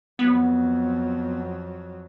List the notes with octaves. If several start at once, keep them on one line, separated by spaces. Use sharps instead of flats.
F2 F#3 B3